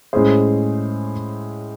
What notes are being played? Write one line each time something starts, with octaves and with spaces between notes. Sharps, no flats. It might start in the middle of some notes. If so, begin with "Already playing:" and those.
A2 G#3 C#4 G#4 C5